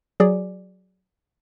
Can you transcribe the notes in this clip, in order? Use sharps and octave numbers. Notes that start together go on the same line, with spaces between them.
F#3 G#4 D5